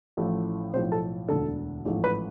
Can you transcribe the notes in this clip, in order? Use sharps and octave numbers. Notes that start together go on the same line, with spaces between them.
A1 A2 F3 A3
B1 A2 F3 C4 C5
A4 A5
E1 D2 D3 A4 A5
A1 G#2 F3 A3
B4 B5